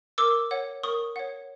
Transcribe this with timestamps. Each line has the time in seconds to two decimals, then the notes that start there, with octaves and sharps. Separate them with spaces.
0.18 A#4 D6 E6
0.51 C#5 F#5
0.83 A#4 C#6 D#6
1.16 C#5 F#5